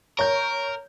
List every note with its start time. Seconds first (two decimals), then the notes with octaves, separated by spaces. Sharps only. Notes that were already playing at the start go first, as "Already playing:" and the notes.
0.19 A#4 C#5 G6